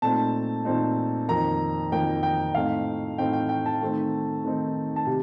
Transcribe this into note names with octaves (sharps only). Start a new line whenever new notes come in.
A#2 A3 C4 D#4 A5
A#2 A3 C4 D#4
F2 D#3 A#3 A#5
F2 D#3 A#3 G5
G5
A2 A3 C4 D#4 F5
A2 A3 C4 D#4 G5
G5
G5
A5
D#3 A3 C4 D#4
D#3 A3 C4 D#4
A5
C3